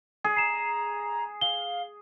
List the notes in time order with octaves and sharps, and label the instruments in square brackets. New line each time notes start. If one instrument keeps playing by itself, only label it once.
[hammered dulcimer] G#4
[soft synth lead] A#5 [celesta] C7 E7
[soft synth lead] F5 [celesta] G7